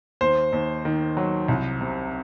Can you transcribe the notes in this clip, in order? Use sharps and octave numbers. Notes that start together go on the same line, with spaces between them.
D#2 C5
D#2
D#3
F#3
C2
C3